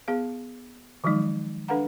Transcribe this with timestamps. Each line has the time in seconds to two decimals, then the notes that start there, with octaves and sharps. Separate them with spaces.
0.08 B3 G#4 F5
1.04 D#3 F3 F#3 G#3 D#4
1.68 D4 A4 B4 F5 F#5 A#5